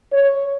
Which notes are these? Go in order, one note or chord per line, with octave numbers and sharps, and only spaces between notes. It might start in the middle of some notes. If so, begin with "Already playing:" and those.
C#5